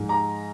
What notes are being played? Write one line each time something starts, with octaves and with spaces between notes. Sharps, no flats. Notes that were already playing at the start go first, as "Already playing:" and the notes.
Already playing: G#2 F3 G#3
A#5